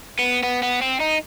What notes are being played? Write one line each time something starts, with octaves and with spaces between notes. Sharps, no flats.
B3
B3
B3
C4
D#4